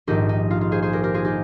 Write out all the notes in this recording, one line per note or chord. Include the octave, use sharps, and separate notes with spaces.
A#1 G#2 D#3 D#4 G4
D#4
F4
F4
G#4 C5
G#4 C5
G4 A#4
G4 A#4
F4 G#4
D#4 G4